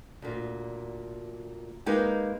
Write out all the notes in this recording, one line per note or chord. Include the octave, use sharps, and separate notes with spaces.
D2 A#2
G#3 A#3 D#4 G4 A#4 B4